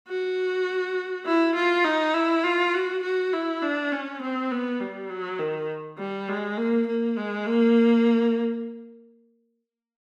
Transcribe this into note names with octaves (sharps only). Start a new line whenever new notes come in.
F#4
E4
F4
D#4
E4
F4
F#4
F#4
E4
D4
C#4
C4
B3
G3
F#3
D#3
G3
G#3
A#3
A#3
G#3
A#3